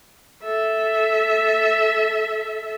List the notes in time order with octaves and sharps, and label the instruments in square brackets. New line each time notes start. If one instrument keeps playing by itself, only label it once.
[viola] A4 E5